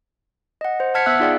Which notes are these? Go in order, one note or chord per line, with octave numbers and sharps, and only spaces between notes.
D#5 F#5
C5
F#5 A5 F6 G#6 B6 C#7
B3 E5 E6 F#6
D#4 F4 G#4 D5 F5 G5